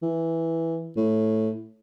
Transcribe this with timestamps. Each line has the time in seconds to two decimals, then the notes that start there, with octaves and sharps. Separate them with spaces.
0.02 E3
0.97 A2